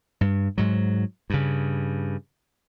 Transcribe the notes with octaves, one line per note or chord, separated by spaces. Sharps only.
G2
G#2 F#3
G2 C#3